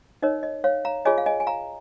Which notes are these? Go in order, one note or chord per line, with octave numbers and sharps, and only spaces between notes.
D#4 A#4 C#5 D#5
D#5
C#5 F5
F5 A#5
F4 G#4 C#5 D#5 G#5
F5
D#5 G#5
G#5
F5 A#5